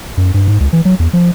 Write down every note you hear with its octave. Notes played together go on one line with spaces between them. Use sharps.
F#2
G2
G#2
C#2
E3
F#3
E2
F3